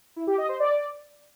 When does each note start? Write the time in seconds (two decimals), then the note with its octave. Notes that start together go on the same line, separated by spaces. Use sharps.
0.16 E4
0.27 G4
0.38 D#5
0.49 C5
0.60 D5